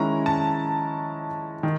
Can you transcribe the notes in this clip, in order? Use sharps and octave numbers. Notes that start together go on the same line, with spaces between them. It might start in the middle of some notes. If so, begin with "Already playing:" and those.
Already playing: D#3 G#3 C#4 E4 A#5
A5
D#3